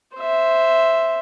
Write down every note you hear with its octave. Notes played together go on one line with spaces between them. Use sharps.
C5 E5